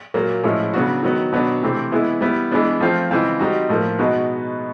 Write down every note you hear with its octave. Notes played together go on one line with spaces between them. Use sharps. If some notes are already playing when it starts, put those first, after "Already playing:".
A#2 F#3 A#3
A2 F3 G#3 C#4 E4
C#3 F#3 B3 D4 F#4
D#3 F#3 B3
B2 F#3 B3 D4
C3 E3 A3 C4
E3 G#3 B3 E4
G3 B3 E4
E3 G#3 B3 D4
F3 A3 C4 F4
C#3 E3 G#3 C4 F4
G3 C4 D#4 F#4
A2 F3 A#3
B2 G#3 B3 D#4 F#4